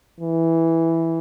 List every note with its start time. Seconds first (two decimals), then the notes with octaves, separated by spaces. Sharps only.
0.20 E3